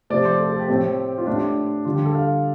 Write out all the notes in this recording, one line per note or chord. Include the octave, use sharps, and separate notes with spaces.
C3 F3 A3 D5
C5
A4
A4
G4
A2 A3 C4
F4
A2 A3 D4 G4
D3 G3 D4 F4
G4
A4
F5